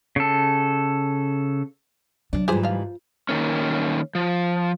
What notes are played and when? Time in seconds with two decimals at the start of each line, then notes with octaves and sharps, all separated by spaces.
0.16 C#3 A4
2.33 D3 F#3 D4
2.48 G#2 E3 G3 F4 G4 G#4 C5
2.63 F3 F5
3.29 D#3 A#3 C#4
4.15 F3